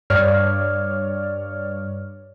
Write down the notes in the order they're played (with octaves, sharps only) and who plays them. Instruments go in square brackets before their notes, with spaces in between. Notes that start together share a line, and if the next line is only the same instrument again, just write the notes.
[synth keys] G2 C#5 D5 F6